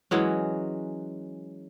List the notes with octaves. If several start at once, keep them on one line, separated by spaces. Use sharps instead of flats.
E3 F#3 G#3 C#4